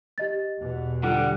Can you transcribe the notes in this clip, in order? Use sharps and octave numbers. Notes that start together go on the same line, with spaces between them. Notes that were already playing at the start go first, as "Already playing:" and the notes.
G4 D#5 A6
E2 B2
D3 G3 F4 A4 F#5